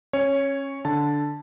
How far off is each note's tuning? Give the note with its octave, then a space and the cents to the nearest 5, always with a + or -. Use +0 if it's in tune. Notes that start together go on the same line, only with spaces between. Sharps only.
C#4 -25 C#5 +0
D3 -5 A5 +0